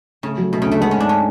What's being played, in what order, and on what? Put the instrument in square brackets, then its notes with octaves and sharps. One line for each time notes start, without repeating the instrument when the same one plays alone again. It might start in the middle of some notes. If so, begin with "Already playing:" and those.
[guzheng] C#3 [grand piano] A3
[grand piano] F#3
[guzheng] B2 [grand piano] A3
[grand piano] D2 [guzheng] C#3
[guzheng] A3
[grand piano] G#3 [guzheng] B3
[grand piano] G#2 [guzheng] C#4
[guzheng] D4
C#4